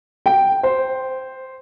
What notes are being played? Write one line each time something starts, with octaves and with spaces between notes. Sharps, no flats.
G5
C5